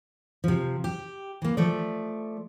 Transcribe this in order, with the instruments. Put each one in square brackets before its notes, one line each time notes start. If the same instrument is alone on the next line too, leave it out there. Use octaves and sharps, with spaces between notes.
[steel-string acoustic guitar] C3 F3
G4
E3 A#3
F3 A3 D5